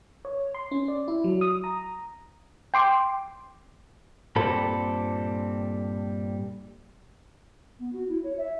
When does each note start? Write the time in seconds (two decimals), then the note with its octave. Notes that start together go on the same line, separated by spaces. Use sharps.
0.25 C#5
0.54 C6
0.71 C#4
0.88 D5
1.08 E4
1.24 F#3
1.41 D#6
1.64 A#5
2.74 G5 C6 D6
4.36 G2 A#2 G3 C4 A4 B5
7.79 B3
7.93 F#4
8.08 E4
8.24 C#5
8.38 E5